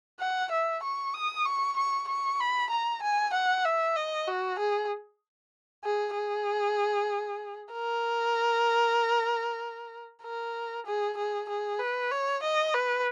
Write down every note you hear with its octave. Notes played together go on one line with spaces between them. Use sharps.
F#5
E5
C#6
D#6
C#6
C#6
C#6
B5
A#5
G#5
F#5
E5
D#5
F#4
G#4
G#4
G#4
A#4
A#4
G#4
G#4
G#4
B4
C#5
D#5
B4